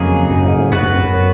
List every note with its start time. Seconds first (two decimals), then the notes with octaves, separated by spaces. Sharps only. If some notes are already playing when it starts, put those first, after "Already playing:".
Already playing: F2 C#3 F#3 A#3 D#4 G#4
0.31 F#2
0.45 G#2
0.58 G#2
0.72 F#2 B3 F#4 B4
0.83 F#2
0.93 F2
1.04 F#2